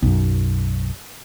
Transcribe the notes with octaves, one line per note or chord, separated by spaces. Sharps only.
B1 F#2